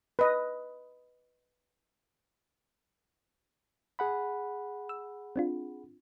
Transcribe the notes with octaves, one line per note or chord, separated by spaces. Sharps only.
B4 D#5
G#4 F#5 B5
E6
C4 D4 F4